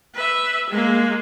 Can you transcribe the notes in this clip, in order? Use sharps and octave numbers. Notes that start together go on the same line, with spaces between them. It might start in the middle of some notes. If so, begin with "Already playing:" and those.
B4 E5
G#3 A#3